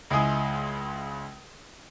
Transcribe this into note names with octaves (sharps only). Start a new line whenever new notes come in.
C#2 G#3 E4 G#4 D#6